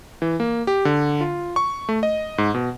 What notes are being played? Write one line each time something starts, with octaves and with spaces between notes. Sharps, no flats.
E3
A#3
G4
D3
F4
C#6
A3
D#5
G#2
B2